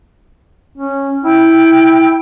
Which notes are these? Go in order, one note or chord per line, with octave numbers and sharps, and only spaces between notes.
C#4
E4 G5